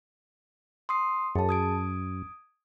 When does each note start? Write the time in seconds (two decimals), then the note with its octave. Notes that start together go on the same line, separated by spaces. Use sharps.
0.89 C6 D#6 C7
1.35 F#2 G#4 A5
1.49 D#6 G#6 D7